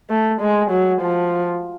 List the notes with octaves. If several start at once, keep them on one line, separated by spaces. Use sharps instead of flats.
A3
G#3
F#3
F3